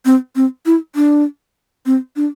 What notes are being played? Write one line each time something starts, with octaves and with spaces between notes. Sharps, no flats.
C4
C4
E4
D4
C4
D4